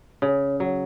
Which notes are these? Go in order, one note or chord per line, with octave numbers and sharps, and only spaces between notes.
C#3
F#3